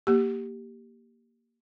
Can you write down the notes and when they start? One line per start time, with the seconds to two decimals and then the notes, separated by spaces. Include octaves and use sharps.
0.07 A#3 G4